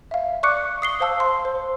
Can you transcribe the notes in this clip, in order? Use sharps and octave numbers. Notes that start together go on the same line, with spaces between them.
E5 F5
D5 C#6 D6 F#6 C#7
D#6 C7 G7
C5 F5 A5 E6
C6
C5